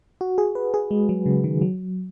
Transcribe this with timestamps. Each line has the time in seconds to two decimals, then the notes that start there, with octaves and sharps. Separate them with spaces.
0.21 F#4
0.38 G#4
0.55 B4
0.74 G#4
0.91 G#3
1.09 F#3
1.26 C#3
1.44 D#3
1.61 F#3